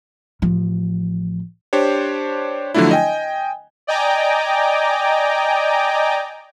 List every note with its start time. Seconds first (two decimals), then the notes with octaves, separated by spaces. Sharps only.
0.42 A1 F3
1.73 D4 G4 C5 C#5
2.74 D3 F3 F#3 A3 D4 E4
2.91 D#5 G5 G#5
3.87 D5 D#5 G5 G#5 A#5 D6